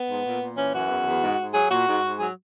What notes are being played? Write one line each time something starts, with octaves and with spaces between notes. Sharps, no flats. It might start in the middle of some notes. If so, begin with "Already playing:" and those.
Already playing: B3
G#2
A#2
A#2
E3 C#4
F#2 F#4
E2
E2
G#2
G#2
F#3 G#4
A#2 F#4
G#2
G#2
F#3 G#4